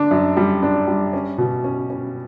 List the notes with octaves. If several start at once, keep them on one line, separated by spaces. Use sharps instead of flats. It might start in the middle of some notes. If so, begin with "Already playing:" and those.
Already playing: D3 D4
F#2
G3
D4
G3
C#4
B2
C#4
C#4